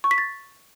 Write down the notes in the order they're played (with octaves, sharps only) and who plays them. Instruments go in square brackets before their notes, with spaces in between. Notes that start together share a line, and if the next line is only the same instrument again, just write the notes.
[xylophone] C#6
B6
A6